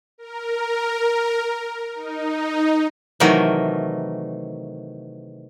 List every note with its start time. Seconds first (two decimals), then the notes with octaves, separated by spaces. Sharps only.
0.18 A#4
1.95 D#4
3.20 C3 D#3 E3 F#3 A3 A#4